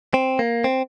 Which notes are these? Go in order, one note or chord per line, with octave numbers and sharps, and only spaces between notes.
C4
A#3
C4